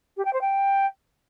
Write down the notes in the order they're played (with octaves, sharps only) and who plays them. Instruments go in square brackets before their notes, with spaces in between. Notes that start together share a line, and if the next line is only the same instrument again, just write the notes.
[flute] G4
G5
C5
G5